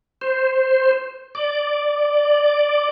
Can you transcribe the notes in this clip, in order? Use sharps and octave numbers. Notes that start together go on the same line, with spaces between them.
C5
D5